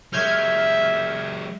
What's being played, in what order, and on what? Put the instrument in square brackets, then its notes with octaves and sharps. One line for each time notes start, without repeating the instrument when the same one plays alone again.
[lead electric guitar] F#3 G#3 [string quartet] E5 [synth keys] F6 G6 G#6